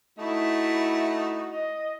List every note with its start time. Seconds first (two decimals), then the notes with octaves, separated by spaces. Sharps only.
0.19 A3 D#4 E4 F#4
1.53 D#5